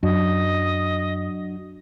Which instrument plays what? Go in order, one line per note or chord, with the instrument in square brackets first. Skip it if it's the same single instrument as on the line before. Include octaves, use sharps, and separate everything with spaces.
[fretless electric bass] F#2 [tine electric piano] F#3 D4 F#4 [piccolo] D#5